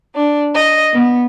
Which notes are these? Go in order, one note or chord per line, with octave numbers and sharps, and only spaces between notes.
D4
D#5
B3